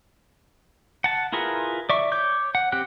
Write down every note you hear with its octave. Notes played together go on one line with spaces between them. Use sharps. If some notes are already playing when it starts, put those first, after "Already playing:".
F#5 A5
E4 F4 G#4 A#4 B4
D5 E5 C#6
C#5 D6 G6
F#5
C4 G4 G5 F#6